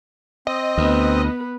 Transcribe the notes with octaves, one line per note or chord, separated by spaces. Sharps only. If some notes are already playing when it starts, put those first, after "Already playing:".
C4 D#5
D2 B3 B4